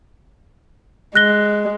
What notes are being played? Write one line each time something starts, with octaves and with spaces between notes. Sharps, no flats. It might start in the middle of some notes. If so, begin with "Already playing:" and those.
G#3 F#6 A#6 G7